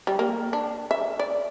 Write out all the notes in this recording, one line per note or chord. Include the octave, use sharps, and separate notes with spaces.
G3
A#3
D4
E5
D5